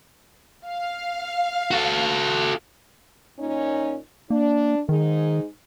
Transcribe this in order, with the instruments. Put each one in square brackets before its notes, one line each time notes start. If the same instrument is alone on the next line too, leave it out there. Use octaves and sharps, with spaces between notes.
[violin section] F5
[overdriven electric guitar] F#4 A4
[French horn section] A#2 C#4 D#4
[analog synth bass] A#3 [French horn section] D4
[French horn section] G#2 D#4 G#4 [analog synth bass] D#3